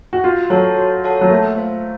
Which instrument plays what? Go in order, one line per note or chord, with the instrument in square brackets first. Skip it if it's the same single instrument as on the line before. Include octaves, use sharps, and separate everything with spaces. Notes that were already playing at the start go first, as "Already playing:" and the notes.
[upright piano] F#4
[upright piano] F4 [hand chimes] F#4
[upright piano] F#3 [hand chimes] A4 C#5 F#5 A5
[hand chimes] F#4
A4 C#5 F#5 A5
[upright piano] F#3
[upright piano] A3 [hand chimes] A#3
[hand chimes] F4 C5 F5